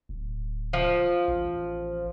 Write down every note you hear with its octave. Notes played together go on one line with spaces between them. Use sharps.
D1
F3
A1